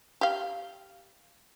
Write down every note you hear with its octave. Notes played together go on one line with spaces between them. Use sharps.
G4 F5